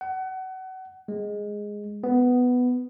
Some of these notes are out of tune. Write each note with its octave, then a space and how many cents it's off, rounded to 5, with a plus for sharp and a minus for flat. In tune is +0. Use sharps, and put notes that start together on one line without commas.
F#5 +30
G#3 -5
B3 +5